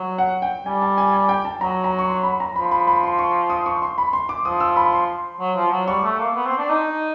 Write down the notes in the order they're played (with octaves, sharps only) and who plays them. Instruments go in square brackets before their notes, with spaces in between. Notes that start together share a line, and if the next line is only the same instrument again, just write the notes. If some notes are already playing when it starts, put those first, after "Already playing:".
Already playing: [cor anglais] F#3
[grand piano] F#5
G5
[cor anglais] G3 [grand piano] G#5
[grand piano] A5
G#5
G#5
G5
A5
[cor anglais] F#3 [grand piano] A#5
[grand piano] A#5
C#6
C6
B5
A#5
[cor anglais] F3 [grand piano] B5
[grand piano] B5
B5
C6
C#6
D#6
C#6
C6
B5
C6
D6
[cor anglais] F3 [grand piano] D#6
[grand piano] E6
B5
C6
[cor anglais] F#3
F3
F#3
[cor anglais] G3 [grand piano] C#6
[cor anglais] A3
A#3
B3
C4
D4
D#4